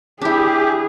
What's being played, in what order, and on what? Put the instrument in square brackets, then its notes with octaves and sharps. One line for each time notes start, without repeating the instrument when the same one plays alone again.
[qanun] D4 E4 [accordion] G4 [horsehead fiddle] G#4